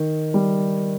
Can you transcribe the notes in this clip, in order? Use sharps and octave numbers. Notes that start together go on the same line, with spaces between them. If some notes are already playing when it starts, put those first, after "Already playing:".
Already playing: D#3
G3